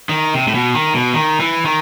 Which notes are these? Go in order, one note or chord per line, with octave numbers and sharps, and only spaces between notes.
D#3
C3
A2
B2
D#3
B2
D#3
E3
D#3